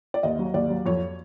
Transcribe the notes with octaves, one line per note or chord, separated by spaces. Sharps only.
D5
D#2 D#5
F#3
D#2 D5
F#3
F2 C#5